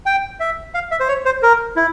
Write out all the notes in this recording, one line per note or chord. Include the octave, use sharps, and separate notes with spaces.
G5
E5
F5
E5
C5
C#5
C5
A#4
E4